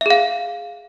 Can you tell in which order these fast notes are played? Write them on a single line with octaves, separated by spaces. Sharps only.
E5 G#4 F5